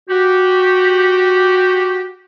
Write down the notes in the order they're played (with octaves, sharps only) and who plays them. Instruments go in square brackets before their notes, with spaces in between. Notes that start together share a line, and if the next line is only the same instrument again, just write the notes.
[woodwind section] F#4 G4